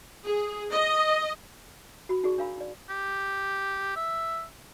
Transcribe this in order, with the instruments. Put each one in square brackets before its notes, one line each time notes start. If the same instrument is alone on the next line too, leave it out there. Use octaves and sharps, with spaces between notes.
[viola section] G#4
D#5
[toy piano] F#4 B5
D#4 F#4 G#4 D5 C#6
D4 A#4 F5 A#5 B5
D#4 D5
[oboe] G4
E5